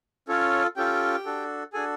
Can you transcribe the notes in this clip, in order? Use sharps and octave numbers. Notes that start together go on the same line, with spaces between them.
C#4 F4 A4 C#5
C#4 F4 G4 A4 G5
D4 F#4 A4
D4 F#4 G#4 A4 G#5